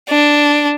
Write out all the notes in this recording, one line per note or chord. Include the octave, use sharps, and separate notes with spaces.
D4